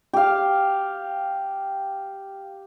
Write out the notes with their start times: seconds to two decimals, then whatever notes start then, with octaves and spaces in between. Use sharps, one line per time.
0.14 G4 F5